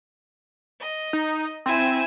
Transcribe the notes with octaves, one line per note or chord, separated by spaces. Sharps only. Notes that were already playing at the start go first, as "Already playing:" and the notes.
D#5
D#4
C4 E4 G#5 E6